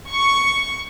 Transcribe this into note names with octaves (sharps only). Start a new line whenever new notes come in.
C#6